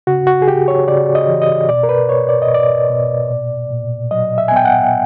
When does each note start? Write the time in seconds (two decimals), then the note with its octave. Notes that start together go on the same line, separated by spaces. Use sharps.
0.07 C#3 F#4
0.27 F#4
0.42 G#4
0.47 C#3 G4
0.68 C#5
0.88 C#3 D5
1.15 D#5
1.28 E3
1.42 D#5
1.69 B2 D5
1.83 A#4
1.89 B4
2.09 B2 C#5
2.29 D5
2.42 D#5
2.49 B2
2.54 D5
2.90 B2
3.30 A#2
3.71 A#2
4.11 F#3 D#5
4.38 E5
4.48 G#5
4.52 B3 G5
4.65 F#5